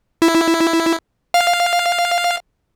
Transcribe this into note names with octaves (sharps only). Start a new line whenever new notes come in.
E4
F5